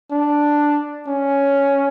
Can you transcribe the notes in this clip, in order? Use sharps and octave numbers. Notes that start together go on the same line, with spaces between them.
D4
C#4